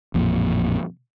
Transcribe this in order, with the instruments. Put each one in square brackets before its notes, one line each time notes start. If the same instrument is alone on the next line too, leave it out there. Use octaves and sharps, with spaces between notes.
[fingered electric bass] A1 F2 A#2